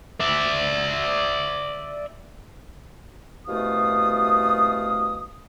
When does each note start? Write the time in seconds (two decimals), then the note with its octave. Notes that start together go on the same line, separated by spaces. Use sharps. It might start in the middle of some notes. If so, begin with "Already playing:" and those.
0.20 D5 E5
3.47 C2 F#2 B2 A3 F5 D#6